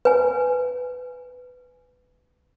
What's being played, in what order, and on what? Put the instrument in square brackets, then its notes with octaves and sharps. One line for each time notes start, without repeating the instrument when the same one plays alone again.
[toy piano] B4 G#5